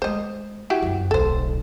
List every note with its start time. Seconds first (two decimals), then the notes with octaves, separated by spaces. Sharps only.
0.02 G#3 A3 C5 D#5
0.70 E4 F#4 G4
0.82 F#1 F2
1.11 D1 B1 A4 C5